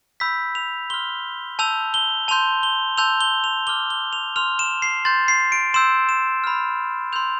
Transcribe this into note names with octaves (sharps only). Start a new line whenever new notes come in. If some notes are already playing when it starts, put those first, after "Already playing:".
B5 E6 G6 B6
F7
C6 F6 G7
A5 E6 G6 F7
G7
A5 C6 G6 F7
G7
A5 C6 E6 G6 F7
G7
F7
A5 D6 F6 G7
G7
F7
C6 F6 F7
E7
C7
C6 G6 A6
C7
D7
C6 E6 G6 E7
E7
B5 F6
C6 E6 G6 F7